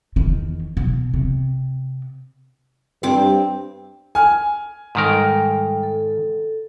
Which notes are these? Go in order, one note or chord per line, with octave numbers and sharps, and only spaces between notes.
E2 D#3
B2
C3
G2 C4 D6
G#5 F6
G#2 D#3 G3 A4 A#4 G5
A4